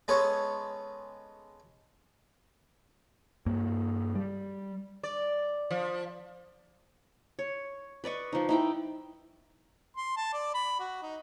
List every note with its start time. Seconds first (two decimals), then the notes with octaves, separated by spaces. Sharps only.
0.08 G#3 B3 C#4 A4 C#5
3.46 G2 A#3
4.15 G3
5.03 D5
5.71 F3
7.39 C#5
8.04 B4 D5 D#5 C#6
8.33 F3 D#4
8.49 D#4 E4 G5
9.96 C6
10.16 A5
10.33 D5
10.54 B5
10.79 F#4
11.02 D#4